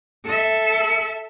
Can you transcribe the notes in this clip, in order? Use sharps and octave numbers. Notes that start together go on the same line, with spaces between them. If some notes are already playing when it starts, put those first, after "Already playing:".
A4 E5